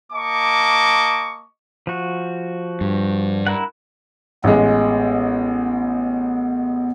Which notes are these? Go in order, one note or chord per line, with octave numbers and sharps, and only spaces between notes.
A#3 D#5 A5 C#6 D6
F3 F#4
G2
E4 A#4 F#5
A1 G#3 B3